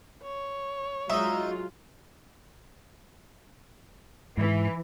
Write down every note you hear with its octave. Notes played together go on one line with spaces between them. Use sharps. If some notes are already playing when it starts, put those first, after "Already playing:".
C#5
F#3 G#3 D#4 F4 D#5 E5
G#2 E3